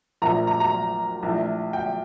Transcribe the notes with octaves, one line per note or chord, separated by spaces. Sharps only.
A#1 A#2 F3 A3 A#5
A#5
A#5
A#1 A2 A3
G5